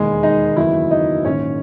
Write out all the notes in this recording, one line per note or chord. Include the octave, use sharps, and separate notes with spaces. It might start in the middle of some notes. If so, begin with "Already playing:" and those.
Already playing: E1 D#2 D#3 G#3 G#4
D#4 D#5
F#1 E2 D#3 F#3 E4 E5
D#4 D#5
A#1 G#2 D#3 C#4 C#5